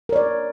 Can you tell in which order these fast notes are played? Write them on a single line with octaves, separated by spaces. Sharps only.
A#4 C#5 D5